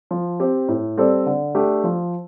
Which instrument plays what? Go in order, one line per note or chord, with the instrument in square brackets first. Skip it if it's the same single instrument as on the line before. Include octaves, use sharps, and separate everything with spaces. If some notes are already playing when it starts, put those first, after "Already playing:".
[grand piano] F3
C4 G4
A2
G3 C4 A4 D5
D3
A3 D4 G4
F3